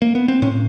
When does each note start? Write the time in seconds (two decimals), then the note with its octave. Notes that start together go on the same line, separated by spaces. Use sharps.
0.02 A#3
0.15 B3
0.28 C4
0.42 A2 C#4